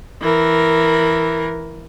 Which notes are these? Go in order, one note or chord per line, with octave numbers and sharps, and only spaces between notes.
E3 A#4